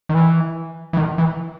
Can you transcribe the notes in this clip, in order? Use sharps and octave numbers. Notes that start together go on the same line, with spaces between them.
D#3
E3
E3
D#3
E3